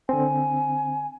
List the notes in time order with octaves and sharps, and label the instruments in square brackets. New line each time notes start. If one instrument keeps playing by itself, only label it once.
[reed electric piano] D3 C4 [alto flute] G#5